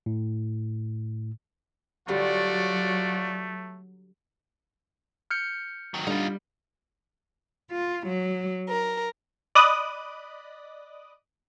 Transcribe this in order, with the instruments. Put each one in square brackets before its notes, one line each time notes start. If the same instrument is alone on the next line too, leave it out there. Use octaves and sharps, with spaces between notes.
[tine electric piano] A2
[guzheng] D3 G3 C5 [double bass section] F#3 [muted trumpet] A3 [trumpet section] F4 F#4 D5
[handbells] F6 G6 C#7
[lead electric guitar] D#3 F#3
[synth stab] D3 [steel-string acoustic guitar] G3 [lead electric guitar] D#4 F4
[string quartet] F4
F#3
A#4
[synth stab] D5 D#5 B5 D6 D#6 F#6